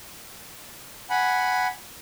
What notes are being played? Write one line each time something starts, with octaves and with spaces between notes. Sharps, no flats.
F#5 G#5 B5